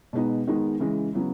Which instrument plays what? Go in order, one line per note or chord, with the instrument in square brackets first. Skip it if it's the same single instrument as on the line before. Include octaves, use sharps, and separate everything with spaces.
[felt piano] B2 G#3 B3 D#4
D#3 G#3 B3 D#4
C#3 E3 G#3
C#3 F#3 B3 E4